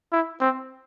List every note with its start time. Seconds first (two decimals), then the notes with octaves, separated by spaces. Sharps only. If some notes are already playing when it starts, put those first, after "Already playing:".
0.12 E4
0.40 C4